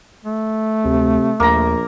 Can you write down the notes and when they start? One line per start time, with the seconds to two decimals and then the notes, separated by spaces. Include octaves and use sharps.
0.25 A3
0.85 D2 C3
1.40 A#1 D#2 A#3 A#5